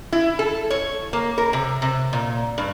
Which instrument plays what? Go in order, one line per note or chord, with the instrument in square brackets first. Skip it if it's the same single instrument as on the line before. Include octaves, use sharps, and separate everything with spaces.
[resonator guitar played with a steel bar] E4
A4
C#5
A#3
A#4
C3
C3
A#2
G2